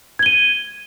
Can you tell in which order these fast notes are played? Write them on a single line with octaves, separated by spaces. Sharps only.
G#6 G7 D#7